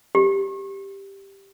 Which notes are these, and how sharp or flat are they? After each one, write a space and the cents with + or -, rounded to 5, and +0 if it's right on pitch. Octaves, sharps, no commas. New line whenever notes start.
G4 +0